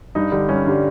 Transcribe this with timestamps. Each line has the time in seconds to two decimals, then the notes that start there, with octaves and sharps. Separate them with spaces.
0.15 G2 D#4
0.32 D3 G3
0.49 G2 C#4
0.66 D3 G3